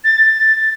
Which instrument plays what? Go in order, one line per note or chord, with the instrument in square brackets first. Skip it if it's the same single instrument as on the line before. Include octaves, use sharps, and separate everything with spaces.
[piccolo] A6